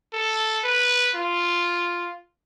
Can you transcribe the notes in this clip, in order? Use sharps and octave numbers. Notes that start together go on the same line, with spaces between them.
A4
B4
F4